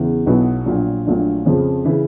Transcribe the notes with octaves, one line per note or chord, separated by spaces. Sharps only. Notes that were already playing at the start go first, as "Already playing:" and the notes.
Already playing: E2 C#3 E3
B1 B2 F#3 B3 E4
A#1 A#2 F#3
A#1 A#2 F#3 A3 D4
F2 C#3 F3
C#3 E3